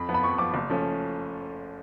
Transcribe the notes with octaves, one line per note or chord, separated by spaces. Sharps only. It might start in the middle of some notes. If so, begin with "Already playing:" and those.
Already playing: F2 B5
F3 B3
B5
F2 C#6
F3 B3 D6
F#1
F3 A3 C#4